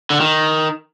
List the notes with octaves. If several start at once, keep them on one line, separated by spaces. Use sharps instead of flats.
D3
D#3